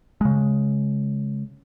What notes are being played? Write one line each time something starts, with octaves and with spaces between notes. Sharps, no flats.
C#3 G#3